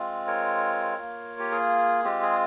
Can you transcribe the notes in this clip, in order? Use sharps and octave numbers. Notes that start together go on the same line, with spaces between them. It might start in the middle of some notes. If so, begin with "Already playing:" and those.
Already playing: G#3 C4 F4
A#4 C#5
A#3 F4
G4
G#4
G#3 C4 F4 G4
G#4